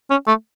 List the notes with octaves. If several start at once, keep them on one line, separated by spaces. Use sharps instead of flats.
C#4
A3